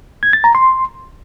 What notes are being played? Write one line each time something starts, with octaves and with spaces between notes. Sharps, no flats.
G#6
A6
A#5
C6